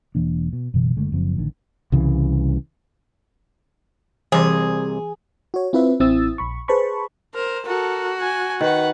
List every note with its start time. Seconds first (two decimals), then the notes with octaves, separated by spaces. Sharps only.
0.15 E1 E3 A#3 D4
0.53 B2
0.74 F#1 B2 E3
0.96 F#1 D3 G#3 A3
1.12 F#1 F3 C4
1.37 A1 D3 D#3
1.92 C2 C#3 E3
4.32 C2 C3 E3 G#4
5.54 F#4 C#5
5.73 C4 E4 F4 B4 E5
6.00 A1 C4 E4 D#6 E6 A6
6.38 A#1 B5 C#6
6.68 G#4 B4 C5 A5 B5 C#6
7.35 A#4 C5
7.66 F#4 A4 A#4
8.21 G#5
8.61 D#3 B4 F#5